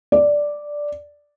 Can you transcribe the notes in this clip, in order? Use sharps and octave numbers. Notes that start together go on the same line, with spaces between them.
D5